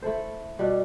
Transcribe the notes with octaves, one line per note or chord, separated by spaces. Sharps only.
A3 E4 A4 C5
B2 G3 D4